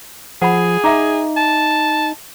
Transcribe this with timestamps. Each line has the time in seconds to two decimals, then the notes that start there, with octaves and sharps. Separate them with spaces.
0.42 F3 G#4 F#5 B5
0.84 D#4 E5 A#5 D6
1.37 A5